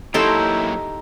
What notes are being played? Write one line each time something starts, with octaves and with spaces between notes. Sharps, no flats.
A#2 F#3 D#4 E4 G4 A4 G5 C6